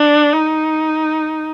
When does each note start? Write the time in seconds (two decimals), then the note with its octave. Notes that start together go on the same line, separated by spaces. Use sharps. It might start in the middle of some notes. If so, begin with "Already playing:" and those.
Already playing: D4
0.33 D#4